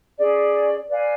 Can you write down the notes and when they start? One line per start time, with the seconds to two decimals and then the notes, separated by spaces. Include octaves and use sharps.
0.16 C#4 G#4 D5
0.89 B4 D5 F5 G#5